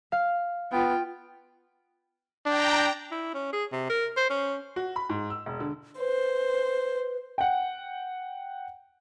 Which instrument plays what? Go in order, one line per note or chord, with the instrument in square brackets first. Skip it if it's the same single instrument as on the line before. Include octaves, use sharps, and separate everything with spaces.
[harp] F5
[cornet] B3 [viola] F4 G5
[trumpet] D4 [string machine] G5 A#5
[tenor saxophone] E4
C#4
G#4
C3
A#4
C5
C#4
[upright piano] F#4
B5
G#2
E6
E1
D3
[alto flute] B4 [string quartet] C5
[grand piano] F#5 G5